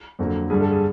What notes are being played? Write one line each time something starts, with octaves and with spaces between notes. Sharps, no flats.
F2 D3 F#3 A#3
G2 D3 G3 G#4
A4
G#4